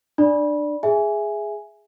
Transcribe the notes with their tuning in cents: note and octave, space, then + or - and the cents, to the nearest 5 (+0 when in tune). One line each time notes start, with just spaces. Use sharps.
D4 +25 D5 +0 B5 -25
G#4 +0 E5 +5 G#5 +0